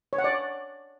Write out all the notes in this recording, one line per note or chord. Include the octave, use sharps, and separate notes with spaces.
C#5
F#5
D5